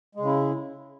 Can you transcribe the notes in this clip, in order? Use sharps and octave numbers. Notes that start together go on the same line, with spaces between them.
C#3 G#3 E4